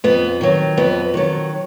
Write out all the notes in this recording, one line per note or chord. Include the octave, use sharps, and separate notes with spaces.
F2 B3
D#3 F#3
F2 B3
D#3 F#3